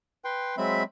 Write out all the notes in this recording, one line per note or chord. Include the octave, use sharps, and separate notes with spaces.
B4 G5 C6
F#3 G#3 C4 E5 B5